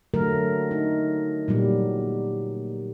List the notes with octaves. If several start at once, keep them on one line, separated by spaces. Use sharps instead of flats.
D3 F#3 A3 A#4
D#4
A#2 F#3 G3